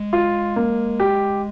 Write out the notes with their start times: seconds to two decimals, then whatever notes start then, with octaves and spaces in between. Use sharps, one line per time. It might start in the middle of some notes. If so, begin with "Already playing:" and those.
Already playing: G#3
0.13 F4
0.56 A#3
1.00 G4